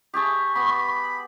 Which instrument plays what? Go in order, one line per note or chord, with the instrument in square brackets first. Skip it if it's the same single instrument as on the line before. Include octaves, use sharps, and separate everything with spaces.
[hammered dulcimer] G4 G#4 A5 [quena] C#6
[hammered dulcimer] B3 [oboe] B5